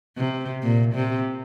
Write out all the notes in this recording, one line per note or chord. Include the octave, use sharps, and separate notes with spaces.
C3
A#2
C3